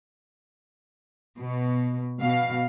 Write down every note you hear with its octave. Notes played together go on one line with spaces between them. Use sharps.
B2
B2 F5